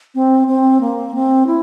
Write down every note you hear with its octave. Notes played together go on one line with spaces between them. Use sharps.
C4
C4
A#3
C4
E4